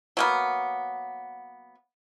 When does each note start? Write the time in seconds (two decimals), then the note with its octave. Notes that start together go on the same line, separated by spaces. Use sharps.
0.17 F#3 A#3 B3